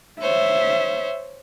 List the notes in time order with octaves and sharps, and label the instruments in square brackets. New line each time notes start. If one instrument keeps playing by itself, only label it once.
[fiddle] C5 C#5 [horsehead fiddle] E5